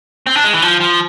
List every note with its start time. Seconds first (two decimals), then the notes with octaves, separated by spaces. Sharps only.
0.27 C4
0.35 D4
0.44 G#3
0.53 E3
0.62 F3
0.80 F3